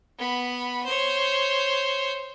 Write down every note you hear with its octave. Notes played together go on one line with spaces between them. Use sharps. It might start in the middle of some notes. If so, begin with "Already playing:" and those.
B3 B5
C5 C#5